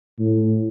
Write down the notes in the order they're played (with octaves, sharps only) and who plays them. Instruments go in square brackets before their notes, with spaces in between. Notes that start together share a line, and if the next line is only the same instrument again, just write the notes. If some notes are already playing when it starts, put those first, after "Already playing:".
[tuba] A2